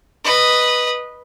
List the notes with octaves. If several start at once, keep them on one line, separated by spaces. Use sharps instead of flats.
B4 D#5